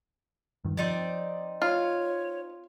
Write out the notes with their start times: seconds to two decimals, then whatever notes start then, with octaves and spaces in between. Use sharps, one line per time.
0.65 G2 D#3
0.77 F3 C4 D#4 D5
1.62 F4 C#5